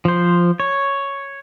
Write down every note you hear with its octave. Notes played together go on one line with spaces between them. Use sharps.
F3 C5
C#5